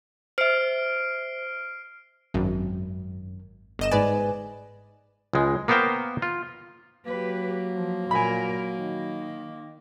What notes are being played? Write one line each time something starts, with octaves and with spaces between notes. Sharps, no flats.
C5 E5 F6 C7 D7
G#1 F#2
G1 D#5 E7
G#2 B4 D5 G#5
C#2 G#3
A#3 B3 A#4 C5 F5 G5
F4
F#3 A#3 G4 B4
F3
A#2 A#4 G#5 B5
D#3